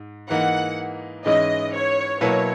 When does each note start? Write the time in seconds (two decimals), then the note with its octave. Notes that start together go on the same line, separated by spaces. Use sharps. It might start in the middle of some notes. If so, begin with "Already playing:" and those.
Already playing: G#2
0.29 G#2 E3 A#3 D#4 F#5
1.25 G#2 E3 G#3 C#4 E4 D#5
1.74 C#5
2.21 B2 F#3 A#3 E4 B4 C#5